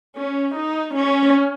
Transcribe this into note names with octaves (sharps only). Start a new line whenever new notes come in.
C#4
D#4
C#4